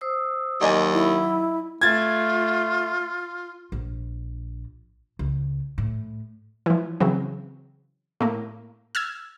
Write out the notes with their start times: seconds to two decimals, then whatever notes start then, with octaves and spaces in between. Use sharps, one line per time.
0.01 C5 D#6 E6
0.61 D#2 F#3 D5 D#5 G#5
0.93 E4
1.81 A3 F4 G#6 A6
3.72 A#1
5.19 C#2
5.78 A2
6.66 E3 F3
7.00 C#3 E3 F#3 C4
8.20 A2 A#3
8.95 E6 F6 G#6